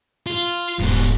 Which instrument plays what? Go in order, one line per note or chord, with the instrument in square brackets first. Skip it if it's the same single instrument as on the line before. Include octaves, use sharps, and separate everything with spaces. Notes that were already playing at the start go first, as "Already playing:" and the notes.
[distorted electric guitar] F4
[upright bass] D#1 [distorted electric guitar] G#2 B3